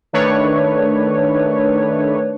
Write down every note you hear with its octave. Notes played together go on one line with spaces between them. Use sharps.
D#3 A3 D4 B4 C#5